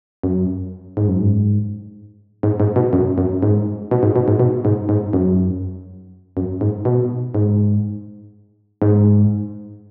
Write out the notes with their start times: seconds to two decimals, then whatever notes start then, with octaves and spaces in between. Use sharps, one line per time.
0.23 F#2
0.97 G#2
1.08 F#2
1.21 G#2
2.43 G#2
2.60 G#2
2.76 B2
2.93 F#2
3.18 F#2
3.43 G#2
3.91 B2
4.03 G#2
4.16 B2
4.28 G#2
4.40 B2
4.65 G#2
4.89 G#2
5.13 F#2
6.37 F#2
6.61 G#2
6.85 B2
7.35 G#2
8.82 G#2